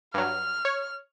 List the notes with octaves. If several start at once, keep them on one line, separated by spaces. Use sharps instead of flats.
G2 F#3 F6
C#5